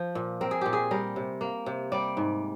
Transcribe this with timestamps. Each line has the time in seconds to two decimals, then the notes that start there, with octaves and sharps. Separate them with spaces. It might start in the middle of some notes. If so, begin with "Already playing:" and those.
Already playing: F3
0.15 A#2
0.41 C4 A#4
0.51 G#4
0.61 A#2 G4
0.73 G#4
0.91 G3 A#4
1.16 C3
1.41 A#3
1.66 C3
1.92 G3 D5
2.17 G#2